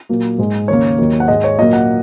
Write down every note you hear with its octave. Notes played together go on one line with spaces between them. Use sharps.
A#2 F#3 A#3
G#2 G#3
D#2 C#3 A#3 C#5
D#2 D#3 F#3 A#3
F#5
G#2 G#3 D#5
C#5
A#2 F#3 A#3 D#5
F#5